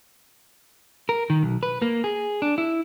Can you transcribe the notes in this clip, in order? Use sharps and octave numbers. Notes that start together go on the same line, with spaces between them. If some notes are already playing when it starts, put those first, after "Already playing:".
A#4
D#3
B1
B4
A#3
G#4
D4
E4